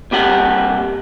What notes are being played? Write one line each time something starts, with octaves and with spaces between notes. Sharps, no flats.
C2 A#3 G4 F#5